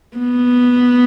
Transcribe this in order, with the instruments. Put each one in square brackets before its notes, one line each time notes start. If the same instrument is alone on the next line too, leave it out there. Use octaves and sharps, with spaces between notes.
[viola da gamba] B3